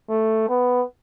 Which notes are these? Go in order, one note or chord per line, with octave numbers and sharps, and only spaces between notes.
A3
B3